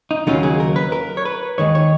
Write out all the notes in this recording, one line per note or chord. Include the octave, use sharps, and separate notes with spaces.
D#4
D#2 C#3 F#3 A#3 C#4 F4
G#4
A#4
B4
A#4
C#5
B4
D#2 D#3 G#3 C#5
C#5